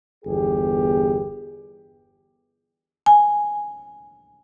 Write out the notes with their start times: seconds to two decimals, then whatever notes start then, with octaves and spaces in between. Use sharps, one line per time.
0.25 G1 E2 G4 G#4
3.06 G#5